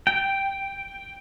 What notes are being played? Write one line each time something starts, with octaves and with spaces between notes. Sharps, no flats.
G5